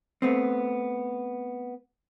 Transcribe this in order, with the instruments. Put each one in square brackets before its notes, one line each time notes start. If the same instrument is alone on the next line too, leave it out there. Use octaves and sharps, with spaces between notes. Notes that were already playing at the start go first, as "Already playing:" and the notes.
[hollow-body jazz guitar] A3 B3 C4